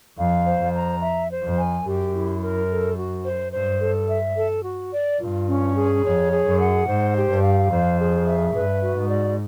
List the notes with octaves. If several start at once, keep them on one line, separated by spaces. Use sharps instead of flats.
F2 F5
C5
F2
A#5
E5
C5
F2
G#5
F#2 G4
E4
A#4
A4
F#4
C5
G2 C5
A4
E5
A4
F#4
D5
G2 F4
C#4
G#4
F2 C#5
G#4
F#2
F#5
G#2 C5
G4
G2
F5
F2 C5
G#4
E5
G2 B4
F#4
G#2
D5